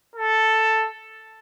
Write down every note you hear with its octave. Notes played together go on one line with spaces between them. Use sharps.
A4